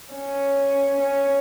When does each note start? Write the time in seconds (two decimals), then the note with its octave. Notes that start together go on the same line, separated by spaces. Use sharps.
0.14 C#4
1.01 C#4